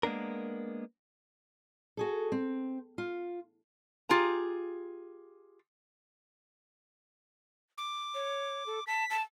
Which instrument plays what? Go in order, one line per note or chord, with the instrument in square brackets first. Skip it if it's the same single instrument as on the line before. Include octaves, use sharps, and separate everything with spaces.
[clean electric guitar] G#3 A#3 B3 D4 A#4
[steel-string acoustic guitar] F#4 G#4 A4
C4
F4
[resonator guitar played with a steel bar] F4 G4 G#4 A#5
[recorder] D6
[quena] C#5
A4
[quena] A5 [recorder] B6
[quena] A5